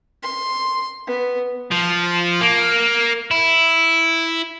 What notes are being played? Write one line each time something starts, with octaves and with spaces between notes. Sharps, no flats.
C6
B3
F3
A#3
E4